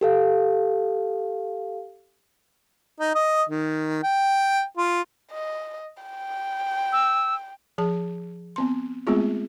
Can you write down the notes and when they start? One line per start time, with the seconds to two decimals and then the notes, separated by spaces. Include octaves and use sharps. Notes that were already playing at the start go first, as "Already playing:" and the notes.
0.01 G4 A4 F5
3.00 D#4
3.15 D#5
3.49 D#3
4.03 G5
4.77 F4
5.32 D#5
6.03 G5
6.92 E6
7.78 F3 G#4 A5
8.56 B3 C4 C6
9.07 G#3 A3 B3 C4 F4 G#4